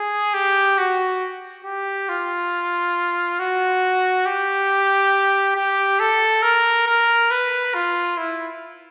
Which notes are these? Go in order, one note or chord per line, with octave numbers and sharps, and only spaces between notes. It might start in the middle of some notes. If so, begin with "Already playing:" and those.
Already playing: G#4
G4
F#4
G4
F4
F#4
G4
G4
A4
A#4
A#4
B4
F4
E4